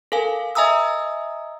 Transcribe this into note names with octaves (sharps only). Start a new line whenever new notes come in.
A4 A#4 F5 G#5
D#5 E5 G#5 A#5 D#6 E6